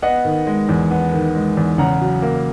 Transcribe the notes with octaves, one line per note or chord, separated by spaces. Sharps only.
B3 D#5 F#5
D#3
G#3
E2
B3
D#3
G#3
E2
C#3 F#5 A#5
F#3
A#3